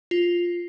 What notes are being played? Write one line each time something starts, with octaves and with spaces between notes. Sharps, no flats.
F4